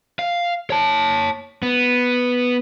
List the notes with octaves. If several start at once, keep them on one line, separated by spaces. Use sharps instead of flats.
F5
C#5 A5
B3